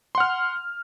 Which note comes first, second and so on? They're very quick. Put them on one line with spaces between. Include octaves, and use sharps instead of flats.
C6 F#5 F6